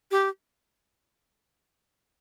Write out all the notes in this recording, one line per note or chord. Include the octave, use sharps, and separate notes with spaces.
G4